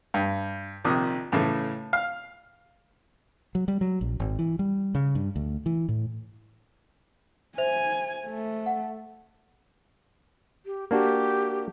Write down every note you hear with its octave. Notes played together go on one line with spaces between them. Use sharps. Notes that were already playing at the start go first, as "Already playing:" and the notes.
G2
A#1 C3 D#3 D#6
A2 C#3 E3 A3
F5
F#3
G3
F#3
A#1
G#1
E3
G3
C#3
G2
D2
E3
A2
C5 E5 G#5 F7
A3
F#5
G4
A#3 D4 F#4 G4